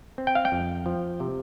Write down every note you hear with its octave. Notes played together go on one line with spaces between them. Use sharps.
C4
G5
F5
G5
F2
F3
C3